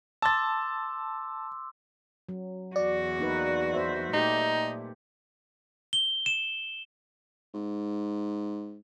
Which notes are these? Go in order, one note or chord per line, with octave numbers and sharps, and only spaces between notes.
A5 C6 D6 E6 A6
F#3
E2 F#4 D5
A#3 D#4 B4
B4 C5 E5
A#2 A3 D#4 G4
G7
E7
G#2